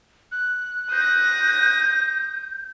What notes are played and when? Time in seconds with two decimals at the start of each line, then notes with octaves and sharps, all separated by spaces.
0.32 F#6
0.91 D#6 G6 A#6